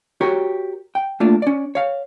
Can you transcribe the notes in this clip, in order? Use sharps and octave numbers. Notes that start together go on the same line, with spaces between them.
F#4 G4 A#4 C#5
G5
A3 A#3 D4 F4
C#4 D5
C#5 F5